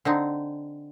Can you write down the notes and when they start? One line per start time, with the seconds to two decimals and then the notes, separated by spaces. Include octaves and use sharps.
0.05 D3 C4 D#4